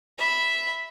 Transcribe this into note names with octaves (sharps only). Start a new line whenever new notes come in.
E5 B5